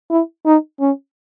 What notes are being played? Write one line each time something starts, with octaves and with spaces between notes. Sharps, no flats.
E4
D#4
C#4